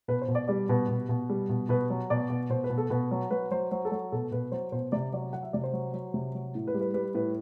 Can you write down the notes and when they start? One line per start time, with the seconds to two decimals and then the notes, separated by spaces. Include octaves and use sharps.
0.08 B2 B4
0.22 C5
0.28 B2
0.35 D5
0.48 G3 D5
0.69 B2 B4
0.88 B2
1.09 B2
1.29 G3
1.49 B2
1.69 B2 B4
1.90 F#3
2.10 B2 D5
2.30 B2
2.50 B2 C5
2.64 B4
2.70 B2
2.78 A4
2.90 B2 B4
3.11 F#3
3.31 F#3 B4
3.51 F#3 C5
3.71 F#3 C5
3.85 A4
3.92 F#3
4.12 B2 A4
4.32 B2 B4
4.52 F#3 C5
4.72 B2 C5
4.92 C3 D5
5.13 F#3 D5
5.33 F#3 F#5
5.43 E5
5.53 C3 D5
5.63 C5
5.73 F#3
5.93 F#3
6.14 C3
6.35 F#3
6.55 A2
6.67 B4
6.74 G3
6.81 B4
6.94 G3 B4
7.15 A2 B4